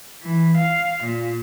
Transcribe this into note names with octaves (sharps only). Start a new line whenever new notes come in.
E3
F5
A#2